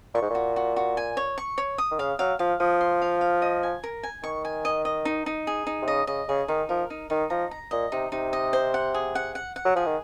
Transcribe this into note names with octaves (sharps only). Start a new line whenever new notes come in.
A#2 C#6
G#2
A#2 F#4
F#4
F#4
G#5
C#5
C#6
C#5
D#6
D#3
C#3 F5
F#3 F5
F3 F5
F3 D#6
C6
F5
F5
D#5
G#5
A#4
G#5
D#3 C#6
G#5
D#5
D#5
D#4
D#4
G#4
D#4
C3
C#3 D#5
C#3 D#5
C#3 G#4
D#3 D#4
F3 A#4
D#4
D#3 D#4
F3 A#5
A#5
A#2 D#5
C3 D#4
C3 D#4
D#5
C5
F#5
G#4
F#5
F#5
F#5
F#3
F3 G#4
D#3